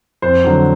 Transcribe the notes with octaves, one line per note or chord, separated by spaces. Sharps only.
F2 C5
D3 F#3